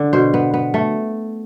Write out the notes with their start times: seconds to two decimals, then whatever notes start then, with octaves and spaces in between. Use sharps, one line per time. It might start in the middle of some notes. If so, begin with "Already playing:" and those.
Already playing: D3
0.13 B2 C5
0.34 B3
0.54 B3
0.74 A3